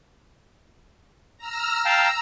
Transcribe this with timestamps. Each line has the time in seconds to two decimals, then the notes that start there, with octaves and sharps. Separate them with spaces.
1.37 A#5 E6 F6
1.85 F5 G5 A5 A#5 E6